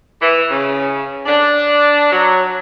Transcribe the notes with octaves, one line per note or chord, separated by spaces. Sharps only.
E3
C#3
D4
F#3